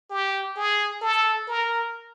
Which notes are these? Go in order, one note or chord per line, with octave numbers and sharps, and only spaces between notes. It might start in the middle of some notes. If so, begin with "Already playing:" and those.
G4
G#4
A4
A#4